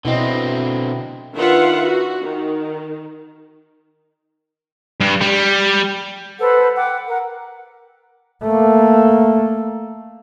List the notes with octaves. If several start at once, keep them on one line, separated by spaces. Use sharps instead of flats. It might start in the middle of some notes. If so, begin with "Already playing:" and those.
B2 D3 C4 E4 D#5
D#3 D4 F4 B4 E5 F#5
F#4
D#3
G2
G3
A4 B4 C5 F#5
F#5 G5 D6
A#4 F#5
A3 A#3